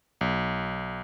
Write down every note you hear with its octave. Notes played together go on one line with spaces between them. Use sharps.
B1